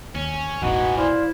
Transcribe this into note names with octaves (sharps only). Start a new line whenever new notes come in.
D#2 C#4
E1 A1 E2 B2 E3 D#4 F#4 F#5
E4 C5 D5 F5